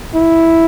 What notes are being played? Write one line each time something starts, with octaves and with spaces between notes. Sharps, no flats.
E4